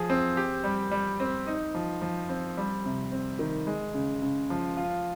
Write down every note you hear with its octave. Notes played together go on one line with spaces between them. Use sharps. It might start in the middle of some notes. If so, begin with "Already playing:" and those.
Already playing: F3 G#4
C4
G4
G3
G3
C4
D#4
F3
F3
C4
G3
C3
C4
D#3
G#3
C#3
C#3
F3
F4